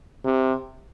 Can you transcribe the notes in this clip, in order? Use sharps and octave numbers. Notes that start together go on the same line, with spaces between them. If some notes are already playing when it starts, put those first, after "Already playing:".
C3